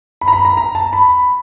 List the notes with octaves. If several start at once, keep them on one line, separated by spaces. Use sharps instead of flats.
B5
A#5
B5
A#5
A#5
A5
B5